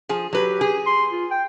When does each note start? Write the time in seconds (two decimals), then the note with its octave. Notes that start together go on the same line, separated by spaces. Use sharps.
0.09 F3 G#4
0.33 F#3 G4 B4
0.61 G#4
0.86 C6
1.12 F4
1.31 G5